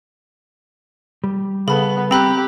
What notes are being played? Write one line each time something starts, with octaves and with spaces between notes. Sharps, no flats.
G3
C#3 B3 A4 A5 B5
C4 G4 A#5 B5 F#6